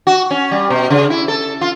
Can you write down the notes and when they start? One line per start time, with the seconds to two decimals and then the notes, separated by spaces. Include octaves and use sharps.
0.07 F#4
0.31 C#4
0.51 G3
0.70 B2
0.90 C#3
1.10 E4
1.28 A4
1.61 F4